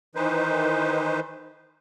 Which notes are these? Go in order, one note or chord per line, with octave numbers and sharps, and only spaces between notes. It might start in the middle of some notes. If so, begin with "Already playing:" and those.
D#3 E3 D#4 B4 C5